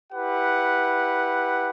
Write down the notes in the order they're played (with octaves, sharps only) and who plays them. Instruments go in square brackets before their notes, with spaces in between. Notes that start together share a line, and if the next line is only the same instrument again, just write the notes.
[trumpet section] E4 G4 B4 F#5